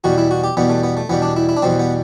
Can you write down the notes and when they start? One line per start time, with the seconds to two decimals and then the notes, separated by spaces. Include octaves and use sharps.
0.04 E2 B2 G3 F#4
0.18 E4
0.31 F#4
0.44 G4
0.57 E2 B2 G3 B3
0.70 A3
0.84 B3
0.97 A3
1.09 E2 B2 G3 B3
1.22 D4
1.36 E4
1.49 E4
1.56 D4
1.62 E2 B2 G3 C4
1.79 B3